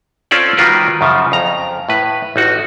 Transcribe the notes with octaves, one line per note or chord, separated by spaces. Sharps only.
C4 C#4 F4 A4 D5
D#3 G3 F4 F#4 A#4 B4
F#2 C#3 F3
F2 A#5
A2 B4
A1 D#4 F#4